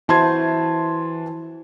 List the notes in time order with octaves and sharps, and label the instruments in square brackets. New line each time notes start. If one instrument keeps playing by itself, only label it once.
[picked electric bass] E3 [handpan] E4 F#4 C5 [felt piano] A5 C6 G#6